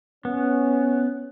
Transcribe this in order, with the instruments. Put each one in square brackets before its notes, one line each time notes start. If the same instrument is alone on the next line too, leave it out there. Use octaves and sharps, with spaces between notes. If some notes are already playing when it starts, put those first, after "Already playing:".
[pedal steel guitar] B3 [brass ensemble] C#4